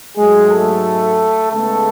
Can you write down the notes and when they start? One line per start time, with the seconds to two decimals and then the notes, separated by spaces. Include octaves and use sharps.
0.17 G#2 F#3 G#3 A3 G#4
0.51 A3 A4
1.51 C#3 G#3 A3 B3 A4